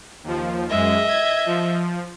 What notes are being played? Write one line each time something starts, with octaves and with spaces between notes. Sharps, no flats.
D#2 F3
F#2 G#3 D#5 E5
G#6
F3